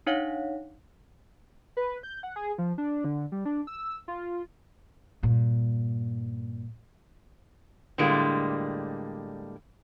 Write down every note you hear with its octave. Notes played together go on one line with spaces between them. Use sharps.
D4 D#4 C#5 F5 F#5
B4
G6
F#5
G#4
F3
D4
D3
G3
D4
E6
F4
G2 A#2
A2 D3 G3 G#3 A#3